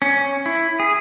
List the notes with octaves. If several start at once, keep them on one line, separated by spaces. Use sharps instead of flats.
C#4
E4
G#4